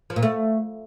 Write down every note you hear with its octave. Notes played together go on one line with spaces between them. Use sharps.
F3
A#2
A3